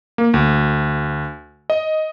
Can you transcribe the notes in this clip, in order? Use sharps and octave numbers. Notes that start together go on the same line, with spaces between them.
A#3
D2
D#5